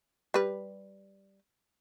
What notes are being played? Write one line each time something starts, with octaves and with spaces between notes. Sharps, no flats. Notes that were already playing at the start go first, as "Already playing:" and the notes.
G3 B4